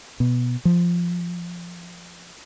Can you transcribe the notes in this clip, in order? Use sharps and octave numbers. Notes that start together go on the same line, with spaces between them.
B2
F3